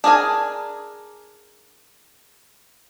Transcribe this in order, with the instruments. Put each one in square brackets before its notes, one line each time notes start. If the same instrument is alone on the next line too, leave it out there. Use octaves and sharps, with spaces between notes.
[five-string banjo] D4 G#4 A#4 G#5